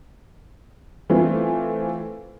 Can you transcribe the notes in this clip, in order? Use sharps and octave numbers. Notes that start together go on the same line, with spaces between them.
E3 A3 C4 F4